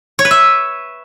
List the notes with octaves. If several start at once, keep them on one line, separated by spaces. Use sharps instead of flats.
C#5
B4
E5